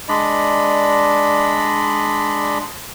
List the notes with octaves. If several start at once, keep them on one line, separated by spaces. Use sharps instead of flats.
G#3 D4 D5 D#5 B5